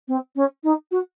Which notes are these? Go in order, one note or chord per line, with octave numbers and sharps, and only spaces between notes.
C4
C#4
D#4
F#4